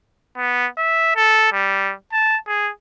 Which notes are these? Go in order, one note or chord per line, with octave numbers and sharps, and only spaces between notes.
B3
E5
A4
G3
A5
G#4